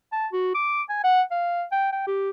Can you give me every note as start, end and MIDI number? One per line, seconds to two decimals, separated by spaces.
0.12 0.27 81
0.33 0.54 66
0.54 0.82 86
0.89 1.01 80
1.04 1.22 78
1.31 1.64 77
1.72 1.91 79
1.92 2.03 79
2.07 2.30 67